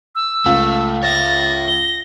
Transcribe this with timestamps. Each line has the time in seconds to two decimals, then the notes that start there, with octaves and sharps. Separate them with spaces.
0.15 E6
0.46 C#2 A3 F5
1.03 C#5 E5 A6 A#6
1.68 G7